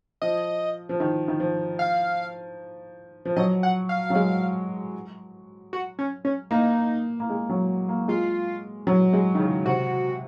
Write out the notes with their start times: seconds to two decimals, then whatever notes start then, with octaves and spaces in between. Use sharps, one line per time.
0.22 F3 D#5
0.89 F3
1.00 D#3
1.28 D#3
1.40 F3
1.79 F5
3.25 F3
3.36 F#3 D#5
3.63 F#5
3.89 F5
4.10 F#3
4.15 G#3
5.73 F#4
5.99 C#4
6.25 C#4
6.51 A#3 D#4
7.20 A#3
7.30 G#3
7.49 F#3
7.89 A#3
8.08 G#3 F4
8.87 F#3
9.13 G#3
9.35 D#3
9.39 C#3
9.65 C3 F#4